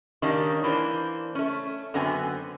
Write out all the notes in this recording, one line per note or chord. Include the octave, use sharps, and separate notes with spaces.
D#3 G3 A#3 C#4 D4
E3 A#3 D4 C5
A3 C#4
F#2 D3 B3 C4 G#5